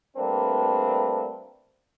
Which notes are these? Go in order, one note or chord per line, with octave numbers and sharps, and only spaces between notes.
G3 A3 A#3 C4 D4 B4